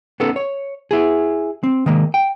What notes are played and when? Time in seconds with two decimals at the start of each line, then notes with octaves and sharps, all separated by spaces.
0.20 B3 C#4 D#4 A4
0.36 C#5
0.91 E4 G#4
1.63 C4
1.86 D#3 G#3 A#3
2.14 G5